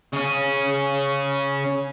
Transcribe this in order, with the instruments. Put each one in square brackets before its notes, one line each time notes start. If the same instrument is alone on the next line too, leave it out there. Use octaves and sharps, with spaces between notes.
[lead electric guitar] C#3 C#4